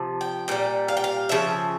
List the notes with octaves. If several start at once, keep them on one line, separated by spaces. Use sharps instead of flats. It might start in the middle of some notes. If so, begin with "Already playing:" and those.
Already playing: C3 F3
G5
A#2 G3 G5
F5
G5
F5
C#3 F3 E5